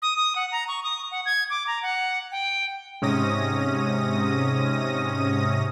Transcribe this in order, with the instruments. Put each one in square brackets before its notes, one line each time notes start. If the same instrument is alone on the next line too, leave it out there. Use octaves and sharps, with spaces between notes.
[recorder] D#6
D#6
F#5
A#5
C#6
D#6
F#5
G#6
D6
A#5
F#5
G5
[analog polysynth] G#2 C3 C#4 D#6 A#6